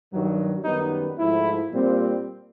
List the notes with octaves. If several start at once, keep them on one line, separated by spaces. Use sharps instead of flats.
G2 D#3 F#3
F#2 D#3 G3 B3 D#4
G#2 F3 A3 E4
A#2 G3 C4